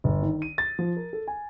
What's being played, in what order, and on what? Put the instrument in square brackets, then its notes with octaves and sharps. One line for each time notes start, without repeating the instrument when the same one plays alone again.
[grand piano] G1
D#3
D#7
A6
F3
A#4
A4
G#5